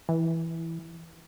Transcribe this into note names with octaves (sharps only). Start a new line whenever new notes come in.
E3